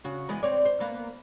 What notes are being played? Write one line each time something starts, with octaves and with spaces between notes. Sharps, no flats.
C#3 F#4
E3 G#3 B3
C4 C#5 D5
C5
A#3 B3